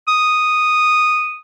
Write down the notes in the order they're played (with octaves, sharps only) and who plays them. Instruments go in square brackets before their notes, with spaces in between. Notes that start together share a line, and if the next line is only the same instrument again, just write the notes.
[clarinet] D#6